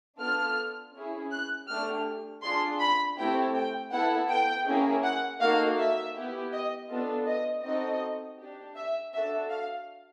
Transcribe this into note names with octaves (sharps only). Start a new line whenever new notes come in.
B3 D4 F4 A4 F6
C#4 E4 G#4
F#6
A3 D4 G4 F6
D4 F4 G#4 C6
B5
A3 C4 E4 G4 G5
G5
B3 E4 A4 F#5
G5
A#3 C#4 E4 G#4
F#5
A#3 D#4 F#4 A4 F5
E5
B3 E4 G4
D#5
B3 D4 F4 A4
D#5
C4 D#4 F#4 A4 D#5
D4 G4
E5
D4 F#4 A4 E5
F5